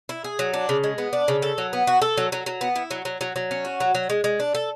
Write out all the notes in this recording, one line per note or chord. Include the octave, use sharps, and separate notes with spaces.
E4
G#4
F#3
D4
C#3
G#3
B3
D4
C#3
A4
F#3
B3
F#4
A4
F#3
F#3
F#3
B3
E4
F#3
F#3
F#3
F#3
C#4
F#4
F#3
F#3
G#3
G#3
D4
A4